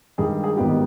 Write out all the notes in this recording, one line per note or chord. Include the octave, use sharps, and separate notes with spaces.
G2 D#3 G#3 G#4
G#4
G#1 G2 D#3 G3 B3 G4